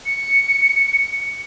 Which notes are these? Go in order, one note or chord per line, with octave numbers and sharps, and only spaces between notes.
C#7